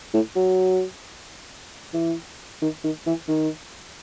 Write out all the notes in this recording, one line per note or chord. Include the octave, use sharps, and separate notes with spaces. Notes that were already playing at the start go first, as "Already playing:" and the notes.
A2
F#3
E3
D#3
D#3
E3
D#3